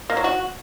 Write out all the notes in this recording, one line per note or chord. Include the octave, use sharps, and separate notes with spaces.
A#3
F#3
F#4